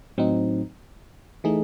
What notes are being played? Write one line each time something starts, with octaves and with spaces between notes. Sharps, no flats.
A2 F#3 C4 D#4
E3 A3 D#4 G#4